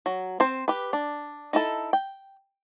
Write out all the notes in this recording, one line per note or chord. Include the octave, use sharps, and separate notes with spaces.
F#3
C4 C5
G4 B4
D4
D#4 E4 A4
G5